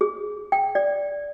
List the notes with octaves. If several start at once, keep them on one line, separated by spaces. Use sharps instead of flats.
G#4
G5
D5